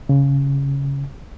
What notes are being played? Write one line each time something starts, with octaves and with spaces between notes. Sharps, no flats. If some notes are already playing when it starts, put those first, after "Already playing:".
C#3